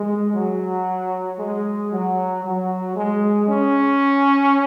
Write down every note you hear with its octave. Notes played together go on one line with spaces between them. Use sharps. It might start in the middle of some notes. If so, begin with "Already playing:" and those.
Already playing: G#3
F#3
G#3
F#3
F#3
G#3
C#4